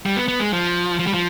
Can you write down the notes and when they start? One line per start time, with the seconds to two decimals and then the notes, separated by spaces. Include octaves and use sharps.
0.06 G3
0.16 B3
0.28 B3
0.40 G#3
0.53 F3
0.99 F3
1.07 G3
1.14 F3